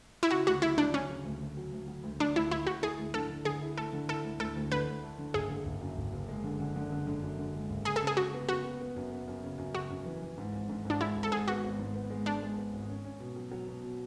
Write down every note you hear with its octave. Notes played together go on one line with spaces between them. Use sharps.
E4
C#3 F#4
D2 F#4
F#3 E4
D2 D4
F#3 C#4
C#3
D2
D2
F#3
D2
F#3
D2
D2 D4
D2 E4
D2 E4
D2 F#4
E4 G#4
D2
D3 A4
D3
D3 G#4
E4
A3 A4
D3
E4 A4
D2
D2 A4
D2
D3 B4
D2
A3
D3
F#1 G#4
D3
F#1
F#2
F#1
F#1
G#3
D3
D3
D3
D3
D3
F#2
D3
G#3
F#1
C#3 G#4
A4
C#3
G#4
C#3 F#4
B3
C#3 F#4
B3
B3
F#2
B3
F#2
C#3
F#2
C#3 F#4
F#2
E3
E3
G#2
G#1
G#2
G#2 D4
G#3 E4
G#1
A4
G#2 G#4
B3 F#4
G#1
G#2
B3
G#3
G#3 D4
G#3
B3
G#1
C#4
C#4
B2
F#3
F#3
B2
B2